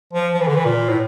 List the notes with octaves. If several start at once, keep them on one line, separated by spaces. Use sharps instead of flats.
F3
F3
E3
D3
E3
A#2
A2